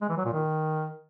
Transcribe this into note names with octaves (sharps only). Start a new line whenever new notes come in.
G#3
E3
F#3
A#2
D#3